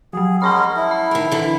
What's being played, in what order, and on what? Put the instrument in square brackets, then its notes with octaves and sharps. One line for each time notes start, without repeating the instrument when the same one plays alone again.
[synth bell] F3 F#3 [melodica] G#4
[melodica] G#3 C#4 A#4 [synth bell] F#5 A5 B5
[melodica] E4
[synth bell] B5
[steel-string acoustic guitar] D#3 A#4
D3 E3